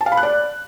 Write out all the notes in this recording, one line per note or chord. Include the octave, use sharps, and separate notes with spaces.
A5
F5
B5
F#6
D5